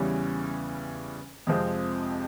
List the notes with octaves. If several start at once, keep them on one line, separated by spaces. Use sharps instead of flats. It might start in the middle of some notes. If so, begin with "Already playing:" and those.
Already playing: E2 C#3 E3 G3 C#4
F2 C3 F3 G#3 C4